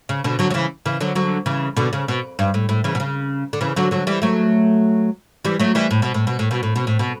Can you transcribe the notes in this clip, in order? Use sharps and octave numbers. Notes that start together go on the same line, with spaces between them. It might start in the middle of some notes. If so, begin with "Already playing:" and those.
C#3
B2 D3
D3 F#3
F#3
C#3 E3
C#3 E3
D3 F#3
D3 F#3
C#3 E3
B2 D3
C#3
B2
G2
A2
A2
C#3 E3
B2
C#3
D3
C#3 E3
D3 F#3
D3 F#3
E3 G3
F#3 A3
E3 G3
F#3 A3
E3 G3
A2
B2
A2
B2
A2
B2
A2
B2
A2
B2